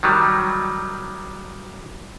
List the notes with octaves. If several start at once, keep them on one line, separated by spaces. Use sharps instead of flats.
D#3 F#3 G3